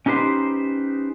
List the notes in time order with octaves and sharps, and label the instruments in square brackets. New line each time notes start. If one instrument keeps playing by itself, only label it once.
[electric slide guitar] C#4 D#4 G4 B4 C5